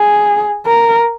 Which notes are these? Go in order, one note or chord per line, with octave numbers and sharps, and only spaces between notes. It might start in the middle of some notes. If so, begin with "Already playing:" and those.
Already playing: G#4
A#4